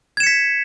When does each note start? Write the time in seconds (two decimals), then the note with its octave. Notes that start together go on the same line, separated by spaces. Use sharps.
0.17 G#6
0.20 E7
0.23 C#7
0.27 B6